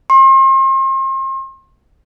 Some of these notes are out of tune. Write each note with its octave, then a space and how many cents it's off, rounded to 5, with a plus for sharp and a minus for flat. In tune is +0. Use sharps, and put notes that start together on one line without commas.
C6 +40